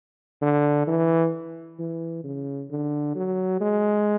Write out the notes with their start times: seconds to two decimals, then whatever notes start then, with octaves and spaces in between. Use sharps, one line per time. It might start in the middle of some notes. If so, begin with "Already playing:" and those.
0.42 D3
0.87 E3
1.79 E3
2.24 C#3
2.71 D3
3.16 F#3
3.61 G#3